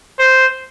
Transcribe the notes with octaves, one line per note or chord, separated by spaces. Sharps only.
C5